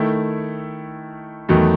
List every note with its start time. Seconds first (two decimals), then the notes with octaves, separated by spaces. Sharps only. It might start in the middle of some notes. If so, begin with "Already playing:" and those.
Already playing: D#3 A3 E4
1.49 E2 D#3 F#3 A3